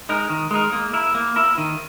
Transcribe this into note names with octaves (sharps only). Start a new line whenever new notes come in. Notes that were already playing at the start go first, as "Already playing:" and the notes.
G#3 D#4 A#4
D#3
G#3 D#4 A#4
A#3
E4 A#4
A#3
E4 A#4
D#3